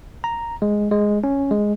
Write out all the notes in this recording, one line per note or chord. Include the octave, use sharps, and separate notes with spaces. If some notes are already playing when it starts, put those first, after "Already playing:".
A#5
G#3
G#3
C#4
G#3